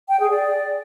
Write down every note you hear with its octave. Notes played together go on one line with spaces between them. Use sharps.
G5
G#4
D5